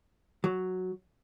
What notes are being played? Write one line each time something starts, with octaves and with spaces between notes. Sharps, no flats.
F#3